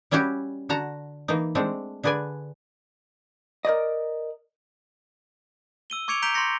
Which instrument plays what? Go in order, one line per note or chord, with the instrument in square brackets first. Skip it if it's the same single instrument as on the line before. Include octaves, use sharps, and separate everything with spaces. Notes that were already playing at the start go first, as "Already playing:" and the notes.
[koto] G3 C#4 E4 F#4 G4
D3 F#4 A5 A#5
E3 A#3 D#4
G#3 A3 C4 D4
D3 G#4 B4 D5 G#5
[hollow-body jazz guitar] A#4 C5 D5 D#5
[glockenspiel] E6 D#7 G7
C#6 D6 G#6 C#7 D7 F7
A#5 G6 B6 D7 F7 G7
C6 C#6 G6 A#6 C#7